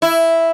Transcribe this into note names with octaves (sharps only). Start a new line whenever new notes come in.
E4